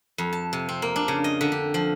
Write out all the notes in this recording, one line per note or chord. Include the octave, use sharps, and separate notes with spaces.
F2
A5
C3
C4
A#3
D4
C#3
D#5
D3
G4
F3